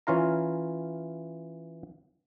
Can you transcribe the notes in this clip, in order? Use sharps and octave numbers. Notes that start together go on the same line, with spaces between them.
E3 C#4 F4 F5 A#5